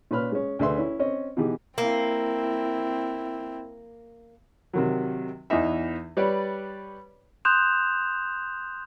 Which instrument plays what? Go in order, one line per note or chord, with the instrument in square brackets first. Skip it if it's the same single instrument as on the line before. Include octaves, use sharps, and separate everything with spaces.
[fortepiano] A#2 C#4 B4 B5 F6
G#3 C#4
D2 G#4 B4 E5 C6
C#4 E4
C4 C#4 C#5 D#5
B2 E3 D#4 G4 G#4
[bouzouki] A#3 [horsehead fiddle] C4 E4
[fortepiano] C3 D#3 F#3
E2 E3 B3 D#4 E5
G3 B4 C#5 D5
[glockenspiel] C6 D#6 F#6 G6 E7 F7